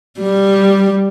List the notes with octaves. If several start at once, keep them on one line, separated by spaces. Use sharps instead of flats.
G3